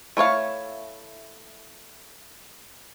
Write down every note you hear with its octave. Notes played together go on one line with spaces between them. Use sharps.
A3 E4 C#5 F5